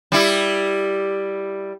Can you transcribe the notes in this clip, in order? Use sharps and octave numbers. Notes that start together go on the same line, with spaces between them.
G3 E4